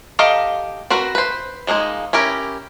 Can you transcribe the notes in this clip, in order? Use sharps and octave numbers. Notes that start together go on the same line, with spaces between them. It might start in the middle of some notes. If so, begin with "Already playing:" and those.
G4 A4 D#5 F5 A#5
C4 F#4 A#4 B4
B4 C5
F3 G#3 A#3 D#4
C#4 E4 G4 A#4